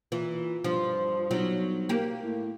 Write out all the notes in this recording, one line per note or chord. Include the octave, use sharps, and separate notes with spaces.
A#2 E3
G2 F3
B1 F#3 G3
A#3 G4
A2